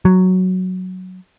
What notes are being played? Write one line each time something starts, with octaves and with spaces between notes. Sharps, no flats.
F#3